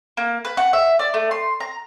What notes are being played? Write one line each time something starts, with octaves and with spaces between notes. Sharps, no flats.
A#3
B4
F#5
E5
D5
A3
C6
A#5